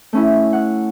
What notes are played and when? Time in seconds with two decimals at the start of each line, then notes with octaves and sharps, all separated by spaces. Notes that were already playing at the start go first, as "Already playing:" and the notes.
0.13 A3 C#4 E4
0.53 F#5